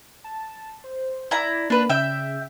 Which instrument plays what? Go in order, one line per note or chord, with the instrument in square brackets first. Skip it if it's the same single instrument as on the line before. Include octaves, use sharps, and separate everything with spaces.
[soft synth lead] A5
C5
[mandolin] E4 A#5 [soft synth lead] D5
[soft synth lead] A#3 [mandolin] D4 B4
[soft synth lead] C#3 [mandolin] E5 G5